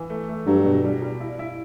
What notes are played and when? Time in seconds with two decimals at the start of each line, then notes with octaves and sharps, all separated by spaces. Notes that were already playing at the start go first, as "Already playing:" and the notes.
Already playing: E3
0.10 A3
0.29 A3
0.47 G2 F#3
0.65 B2
0.84 G3
1.02 G3
1.20 E4
1.39 E4